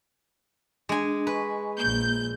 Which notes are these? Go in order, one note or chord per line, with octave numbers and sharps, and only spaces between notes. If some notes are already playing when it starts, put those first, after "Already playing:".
G#3 D4 G#5
B4 D#5 G#5 C#6
A#1 A#3 G6